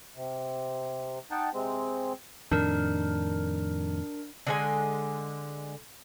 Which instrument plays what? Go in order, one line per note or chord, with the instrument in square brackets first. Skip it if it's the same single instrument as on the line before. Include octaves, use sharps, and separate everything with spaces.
[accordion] C3
D#4 F#5 G5 A5
C3 G#3 C4
[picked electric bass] F2 A2 D#3 [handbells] D4 A#4
[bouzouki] D3 G#3 G#5